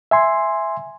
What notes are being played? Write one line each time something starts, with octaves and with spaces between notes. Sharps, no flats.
E5 G#5 C6